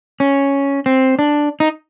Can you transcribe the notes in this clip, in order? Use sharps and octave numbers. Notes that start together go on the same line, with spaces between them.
C#4
C4
D4
D#4